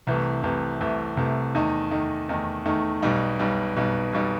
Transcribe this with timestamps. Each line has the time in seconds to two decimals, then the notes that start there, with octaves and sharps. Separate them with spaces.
0.07 C2 C3 E3 A3
0.43 C2 C3 E3 A3
0.81 C2 C3 E3 A3
1.17 C2 C3 E3 A3
1.55 E2 D#3 A3 D#4
1.91 E2 D#3 A3 D#4
2.29 E2 D#3 A3 D#4
2.66 E2 D#3 A3 D#4
3.02 B1 B2 G3 D#4
3.39 B1 B2 G3 D#4
3.76 B1 B2 G3 D#4
4.13 B1 B2 G3 D#4